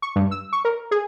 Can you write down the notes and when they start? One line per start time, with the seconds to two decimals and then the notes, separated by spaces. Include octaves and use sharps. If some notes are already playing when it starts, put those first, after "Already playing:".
0.02 C#6
0.16 G2
0.31 E6
0.53 C#6
0.65 A#4
0.91 G#4